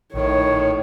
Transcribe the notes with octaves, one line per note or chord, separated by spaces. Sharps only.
A#1 A2 D#3 C#5